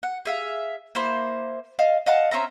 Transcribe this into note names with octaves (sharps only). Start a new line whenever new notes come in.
F#5
G#4 E5 F5
A#3 E4 C5
D#5 F5 A5
D#5 F5 F#5 A5
C4 C#4 E5 A#5